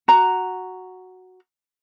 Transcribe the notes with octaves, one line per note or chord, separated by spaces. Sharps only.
F#4 A#5